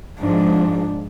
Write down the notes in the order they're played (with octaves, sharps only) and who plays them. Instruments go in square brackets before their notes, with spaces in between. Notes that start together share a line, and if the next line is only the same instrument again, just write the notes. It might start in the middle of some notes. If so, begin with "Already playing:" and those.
[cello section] G#2 F3 [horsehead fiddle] D4